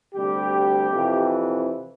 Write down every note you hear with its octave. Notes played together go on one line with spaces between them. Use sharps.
D2 C3 G3 G4
F2 C3 E3